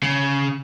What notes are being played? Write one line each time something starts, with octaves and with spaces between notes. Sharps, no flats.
C#3